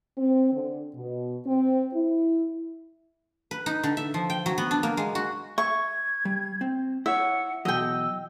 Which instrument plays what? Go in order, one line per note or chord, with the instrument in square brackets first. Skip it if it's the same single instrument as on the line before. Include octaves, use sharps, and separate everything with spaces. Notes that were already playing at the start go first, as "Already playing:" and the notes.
[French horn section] C4
D3
B2
C4
E4
[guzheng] B4
D#4
D3
E5
F3
G5
F#3
B3
D4
A#3
G#3
F#4
[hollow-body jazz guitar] E5 [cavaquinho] C#6 [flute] G#6
[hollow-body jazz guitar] G3
C4
[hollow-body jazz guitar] E4 C#5 [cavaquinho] E5 [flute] F#5
[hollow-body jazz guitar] B2 E3 F#3 [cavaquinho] D#5 G5 [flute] E6